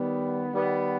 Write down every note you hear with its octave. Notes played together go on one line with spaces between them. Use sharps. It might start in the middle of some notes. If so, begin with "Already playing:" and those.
Already playing: D#3 G3 B3
D#3 G3 B3